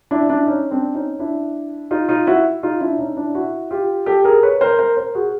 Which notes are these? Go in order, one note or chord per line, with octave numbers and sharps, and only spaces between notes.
D4 E4
D4 E4
C#4 D#4
C4 D4
C#4 D#4
D4 E4
D#4 F4
D#4 F4
E4 F#4
D#4 F4
D4 E4
C#4 D#4
D4 E4
E4 F#4
F4 G4
G4 A4
G#4 A#4
B4 C#5
A#4 C5
A#4 C5
A#4 C5
F#4 G#4